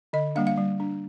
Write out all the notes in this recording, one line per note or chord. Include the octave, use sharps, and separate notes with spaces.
D3 D#5
G3 A#3 D4 F5
F5
G3
D4